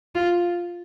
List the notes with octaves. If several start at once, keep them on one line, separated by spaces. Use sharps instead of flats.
F4